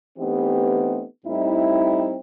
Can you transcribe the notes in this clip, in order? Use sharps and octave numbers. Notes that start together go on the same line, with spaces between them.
E3 A3 B3 C4 D#4 G4
A2 G3 C4 D#4 E4